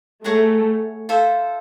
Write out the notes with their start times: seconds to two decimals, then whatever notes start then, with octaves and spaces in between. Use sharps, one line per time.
0.24 A3 G#4 C#5 F#5 A#5
1.09 F4 A4 C5 E5